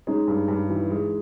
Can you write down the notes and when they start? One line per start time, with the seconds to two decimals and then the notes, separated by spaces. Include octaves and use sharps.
0.07 G#3 C#4 D#4
0.28 G2
0.48 G2
0.70 E3
0.90 G#3